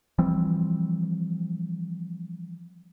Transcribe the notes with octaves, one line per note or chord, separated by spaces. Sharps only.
E3 F3 G3 C4